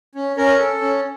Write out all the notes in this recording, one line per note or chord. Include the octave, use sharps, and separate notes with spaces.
C#4
C#4 A#4
A4
C#4